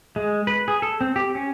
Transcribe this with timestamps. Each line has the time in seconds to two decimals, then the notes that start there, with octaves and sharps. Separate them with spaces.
0.16 G#3
0.47 B4
0.68 G#4
0.82 A4
1.01 C4
1.16 G4
1.35 C#4